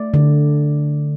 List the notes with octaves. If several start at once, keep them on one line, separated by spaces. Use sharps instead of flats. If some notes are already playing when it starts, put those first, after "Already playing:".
Already playing: A3 D5
D3